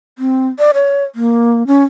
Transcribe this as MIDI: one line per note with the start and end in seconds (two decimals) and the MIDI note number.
0.19 0.47 60
0.59 0.72 74
0.74 1.04 73
1.15 1.66 58
1.67 1.84 61